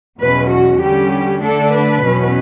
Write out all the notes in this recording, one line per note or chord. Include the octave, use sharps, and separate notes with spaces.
E2 B2 F#3 C#4 B4
F#4
D3 G3 C#4 G4
D3 A3 D4 A4
B4
E2 B2 F#3 C#4